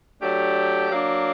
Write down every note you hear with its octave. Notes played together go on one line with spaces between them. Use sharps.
F#3 A3 D4 G4
F#3 A#3 D4